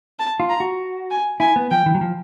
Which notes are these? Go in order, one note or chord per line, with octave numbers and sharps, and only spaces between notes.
A5
F4
A#5
F#4
G#5
E4 G#5
B3
F3 G5
E3
F#3
F3